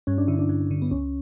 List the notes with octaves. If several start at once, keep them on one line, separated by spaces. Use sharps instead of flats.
G2 C#4
D4
D3 E4
D4
G2
D3
B3
C#2 C#4